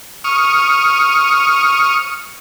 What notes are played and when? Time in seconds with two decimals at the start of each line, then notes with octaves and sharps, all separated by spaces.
0.24 C#6 D#6 F6